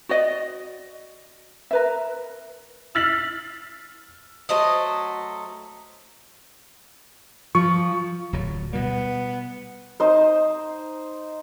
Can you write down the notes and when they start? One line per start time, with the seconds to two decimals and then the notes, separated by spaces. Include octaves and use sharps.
0.09 F#4 D5 D#5
1.71 A#4 B4 E5
2.95 E6 F6 A6 B6 C7 F#7
4.49 F#3 A3 C5 D#5
7.55 F3 C#6
8.33 D1 A#2 F#3
8.73 B2 G3 B3
10.00 D#4 C5